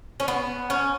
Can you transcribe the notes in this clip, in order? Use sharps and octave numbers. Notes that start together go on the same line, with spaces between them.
C#4
B3
C#4